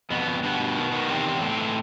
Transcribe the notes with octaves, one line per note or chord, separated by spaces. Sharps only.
F2 B2 B3
F2
G2 B2 B3
G2
D#3
D#3
E2 C3 C4
E2
A2
E3